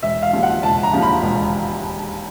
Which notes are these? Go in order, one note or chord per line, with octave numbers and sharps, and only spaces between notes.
E1 E5
F5
D#2 C#3 F3
F#5
E1 A5
A#5
D#2 C#3 F3
B5
E1